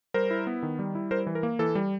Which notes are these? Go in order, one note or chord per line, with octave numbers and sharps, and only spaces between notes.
G3 A#4 C5
E4
B3
D#3
G3
E4
G3 A#4 C5
E3
A#4
A#3
E3 A4
G3